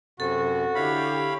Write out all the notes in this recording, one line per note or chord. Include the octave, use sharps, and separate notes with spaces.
F#2 C3 F#4 A4
D3 E4 G4 C#5 F5 B5